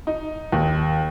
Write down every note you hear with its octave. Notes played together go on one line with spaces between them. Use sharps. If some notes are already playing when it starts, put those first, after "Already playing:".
D#4
D#2